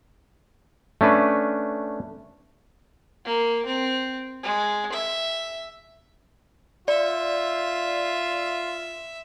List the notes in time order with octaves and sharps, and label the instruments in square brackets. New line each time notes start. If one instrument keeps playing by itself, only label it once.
[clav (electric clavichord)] A3 C#4 D4 B4
[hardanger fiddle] A#3
C4
G#3
E5
[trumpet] F4 [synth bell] D5 [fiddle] E5